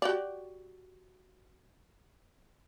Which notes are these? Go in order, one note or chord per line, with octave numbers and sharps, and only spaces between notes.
F#4 G4 D5